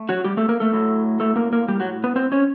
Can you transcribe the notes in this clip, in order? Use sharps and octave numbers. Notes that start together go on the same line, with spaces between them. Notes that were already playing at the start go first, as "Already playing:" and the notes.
Already playing: A3
F#3 F#4
G3 G4
A3 A4
A#3 A#4
A3 A4
A2 F#3 A3
A3 A4
A#3 A#4
A#3 A#4
G3 G4
F#3 F#4
B3 B4
C4 C5
C#4 C#5